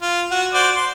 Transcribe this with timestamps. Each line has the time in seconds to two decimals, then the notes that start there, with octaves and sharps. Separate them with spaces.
0.02 F4
0.31 F#4
0.54 F#4 C5 D5
0.76 C6